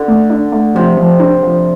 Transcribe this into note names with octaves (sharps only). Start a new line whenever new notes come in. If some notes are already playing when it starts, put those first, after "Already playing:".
Already playing: D3
A3
D4
A3
C3 F3
F3
D4
F3